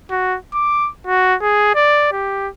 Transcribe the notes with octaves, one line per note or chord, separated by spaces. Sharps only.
F#4
D6
F#4
G#4
D5
G4